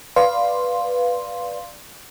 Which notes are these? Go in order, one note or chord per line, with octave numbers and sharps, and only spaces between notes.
B4 D5 F5 C6